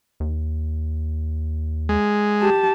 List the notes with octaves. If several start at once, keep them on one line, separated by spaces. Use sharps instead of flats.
D#2
G#3
G4 A5